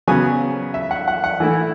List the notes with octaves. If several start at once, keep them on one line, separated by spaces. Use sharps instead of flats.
C#3 F#3 B3 G#5
E5
F#5
F#5
F#5
E3 A3 E4